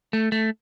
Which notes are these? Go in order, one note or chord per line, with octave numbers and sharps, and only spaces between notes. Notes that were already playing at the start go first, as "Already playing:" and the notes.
A3
A3